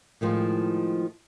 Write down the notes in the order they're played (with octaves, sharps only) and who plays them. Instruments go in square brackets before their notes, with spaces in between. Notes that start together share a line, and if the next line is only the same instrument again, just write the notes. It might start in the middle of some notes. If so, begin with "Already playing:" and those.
[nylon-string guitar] A2 D#3 F3 G#3